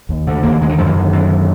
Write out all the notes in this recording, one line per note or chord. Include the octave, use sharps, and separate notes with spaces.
D#2
D3
D#2 A#3
D3 G#3
D#3
F#2 F3
E3
D3 D#3
F#2
D3